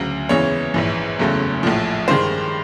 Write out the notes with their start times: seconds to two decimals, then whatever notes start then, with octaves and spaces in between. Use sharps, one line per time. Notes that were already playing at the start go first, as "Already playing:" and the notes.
Already playing: D2 C#3 F#3
0.29 E2 C#3 E3 G#3 C#5
0.74 A#1 G#2 E3
1.19 F#1 E2 C#3 F#3 A3
1.63 A#1 A2 F3
2.08 G2 D#3 G#3 C5